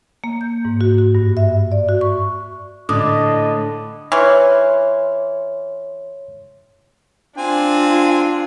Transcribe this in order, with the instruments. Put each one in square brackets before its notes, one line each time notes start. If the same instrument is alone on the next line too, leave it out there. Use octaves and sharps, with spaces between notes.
[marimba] A#3
G6
G#2
F#4
F#4
G2
E5
D5
F#4
C#6
[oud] A2 [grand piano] D3 [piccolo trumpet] D#5 [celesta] D6 D#6
[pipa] E3 [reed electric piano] C#5 C6 F6
[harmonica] C4 G#5 [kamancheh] D4 F4